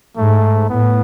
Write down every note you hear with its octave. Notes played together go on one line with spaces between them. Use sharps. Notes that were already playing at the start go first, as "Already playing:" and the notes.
G#2 A3
A2 B3